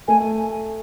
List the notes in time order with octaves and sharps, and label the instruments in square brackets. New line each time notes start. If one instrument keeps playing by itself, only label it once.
[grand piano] A3 [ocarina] G#5